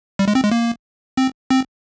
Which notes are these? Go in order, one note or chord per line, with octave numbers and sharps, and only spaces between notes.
G3
G#3
C4
G#3
A#3
C4
C4